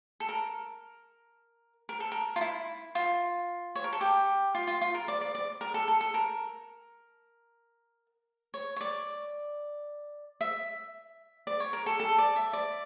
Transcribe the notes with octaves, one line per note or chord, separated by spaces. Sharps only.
A4
A#4
A#4
A4
A#4
F4
E4
F4
C#5
A#4
A4
G4
F4
F4
F4
A#4
D5
D5
D5
A#4
A4
A4
A4
A#4
C#5
C#5
D5
E5
D5
C#5
A#4
A4
A4
D5
E5
D5